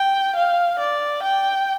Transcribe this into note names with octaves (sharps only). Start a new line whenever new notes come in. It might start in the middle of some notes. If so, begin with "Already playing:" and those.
Already playing: G5
F5
D5
G5